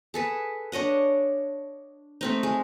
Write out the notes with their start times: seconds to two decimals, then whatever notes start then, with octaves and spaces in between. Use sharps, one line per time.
0.14 G#4 A4 B4
0.72 D4 C#5 D#5 F#5
2.21 A3 C4 D#4
2.43 G#3